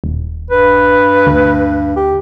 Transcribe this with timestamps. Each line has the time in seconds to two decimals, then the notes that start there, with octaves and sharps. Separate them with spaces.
0.04 D#1
0.51 G2 B4
1.27 D2
1.96 G4